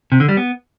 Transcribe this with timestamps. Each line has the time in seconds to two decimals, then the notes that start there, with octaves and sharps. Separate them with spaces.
0.12 C3
0.20 D3
0.29 G3
0.37 B3